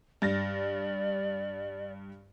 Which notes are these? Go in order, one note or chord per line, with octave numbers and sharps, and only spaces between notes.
G2 D5 A6 A#6